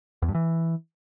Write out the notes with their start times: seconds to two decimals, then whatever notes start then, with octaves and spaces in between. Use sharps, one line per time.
0.22 E2
0.28 G2
0.35 E3